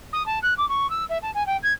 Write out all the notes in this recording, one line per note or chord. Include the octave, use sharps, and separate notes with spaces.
D#6
A5
F#6
D6
C#6
E6
E5
A5
G#5
G5
G#6